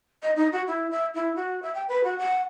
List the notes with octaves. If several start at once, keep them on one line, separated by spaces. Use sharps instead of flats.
D#5
D#4
F#4
E4
E5
E4
F#4
E5
G5
B4
F#4
F#5